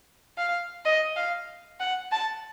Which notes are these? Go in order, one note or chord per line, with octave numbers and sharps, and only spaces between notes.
F5
D#5
F5
F#5
A5